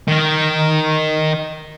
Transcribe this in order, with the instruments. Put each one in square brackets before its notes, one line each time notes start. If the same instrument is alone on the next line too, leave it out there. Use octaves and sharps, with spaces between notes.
[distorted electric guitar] D#3 A#4